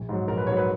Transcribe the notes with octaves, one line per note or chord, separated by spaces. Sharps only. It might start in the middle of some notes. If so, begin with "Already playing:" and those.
Already playing: A#1
G#2 F#3
A#1 A#4
B4
G#2 F#3 C#5
B4